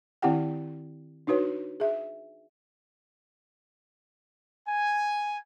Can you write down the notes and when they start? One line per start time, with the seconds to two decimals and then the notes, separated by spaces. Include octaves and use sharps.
0.22 D#3 C4 E4 G4 F#5 G5
1.27 D4 D#4 F#4 B4 C#5
1.80 G#4 E5
4.67 G#5